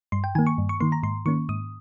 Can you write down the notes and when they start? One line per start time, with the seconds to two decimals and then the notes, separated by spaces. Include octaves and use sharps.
0.12 G2 C6
0.24 G5
0.35 D#3 A#3 G#5
0.47 C#6
0.58 G2
0.69 C#6
0.80 D#3 A#3 C6
0.92 A#5
1.03 G#2 C6
1.26 D#3 A#3 C#4 C#6
1.49 G#2 D#6